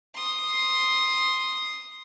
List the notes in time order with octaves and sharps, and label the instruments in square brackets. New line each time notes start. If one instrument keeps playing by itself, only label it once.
[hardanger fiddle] C6 D#6